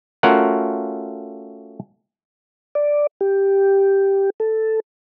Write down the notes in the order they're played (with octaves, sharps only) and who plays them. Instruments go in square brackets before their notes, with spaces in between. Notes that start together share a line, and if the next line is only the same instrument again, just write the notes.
[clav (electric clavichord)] A3 C#4 F4 F#4 A#4 F#5
[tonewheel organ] D5
G4
A4